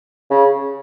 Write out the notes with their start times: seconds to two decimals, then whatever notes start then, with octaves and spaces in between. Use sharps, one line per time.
0.30 C#3